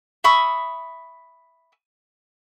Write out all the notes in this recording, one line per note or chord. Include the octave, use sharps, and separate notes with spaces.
E5 B5 C#6 D#6